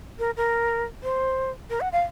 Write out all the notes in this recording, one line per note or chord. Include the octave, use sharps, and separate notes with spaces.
A#4
A#4
C5
A#4
F#5
F5